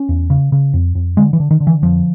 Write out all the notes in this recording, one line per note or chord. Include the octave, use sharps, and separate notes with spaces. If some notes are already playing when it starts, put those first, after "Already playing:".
Already playing: C#4
E2
C#3
C#3
F2
F2
D3 G#3
E3
D3
D#3
D3
E3
F2 F3